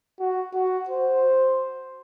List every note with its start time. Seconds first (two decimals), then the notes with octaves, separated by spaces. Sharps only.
0.20 F#4
0.54 F#4
0.89 C5